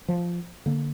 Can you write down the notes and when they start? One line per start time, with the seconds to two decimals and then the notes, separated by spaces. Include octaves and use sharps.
0.08 F3
0.66 D3 A#3